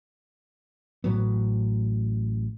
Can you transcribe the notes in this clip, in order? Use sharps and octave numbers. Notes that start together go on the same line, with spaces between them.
A1 A2 F#3 B3